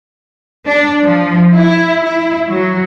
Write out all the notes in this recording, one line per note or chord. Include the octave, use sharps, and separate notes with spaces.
D4
F3
E4
E4
F#3